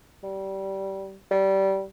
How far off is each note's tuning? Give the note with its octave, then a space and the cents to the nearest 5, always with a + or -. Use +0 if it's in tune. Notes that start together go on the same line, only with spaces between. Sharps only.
G3 -20
G3 -20